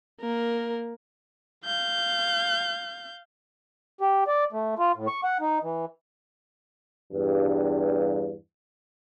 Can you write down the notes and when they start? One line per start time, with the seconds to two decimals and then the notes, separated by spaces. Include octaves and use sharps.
0.21 A#3 A#4
1.65 F5 G6
4.01 G4
4.28 D5
4.52 A3
4.79 F4
4.96 A2
5.08 C#6
5.24 F#5
5.41 D#4
5.63 E3
7.12 E2 G2